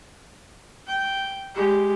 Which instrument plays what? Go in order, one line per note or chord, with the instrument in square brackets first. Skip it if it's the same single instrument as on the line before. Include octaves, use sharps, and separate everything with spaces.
[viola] G5
G#3 G4